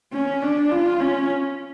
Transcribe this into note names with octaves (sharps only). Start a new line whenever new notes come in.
C#4
D4
F4
C#4